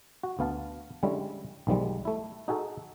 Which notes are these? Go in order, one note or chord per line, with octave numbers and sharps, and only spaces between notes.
F#4
D2 B3 F5 A5
D3 G3 G#3 C#4 E4
B1 D#3 F3 G3 G#3
A3 E4
D#4 F#4 G#4 A4